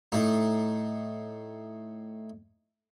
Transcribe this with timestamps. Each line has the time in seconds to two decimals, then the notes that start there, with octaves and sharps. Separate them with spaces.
0.12 A2 D#4